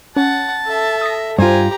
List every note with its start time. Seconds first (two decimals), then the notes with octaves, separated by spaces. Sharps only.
0.17 C#4 F#5 A5
0.66 A4 E5
1.01 D#6 A#6
1.39 G2 F4 G4 C5 G#5 A#5